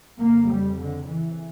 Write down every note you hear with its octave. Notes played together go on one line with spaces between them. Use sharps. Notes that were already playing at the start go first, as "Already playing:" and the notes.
F2 C#3 A#3
G3
D3
E3